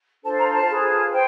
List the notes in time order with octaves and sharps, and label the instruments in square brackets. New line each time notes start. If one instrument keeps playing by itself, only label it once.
[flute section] D4 F4 A4 C5 A5
A#5
A5
F4 G#4 B4
C5 G5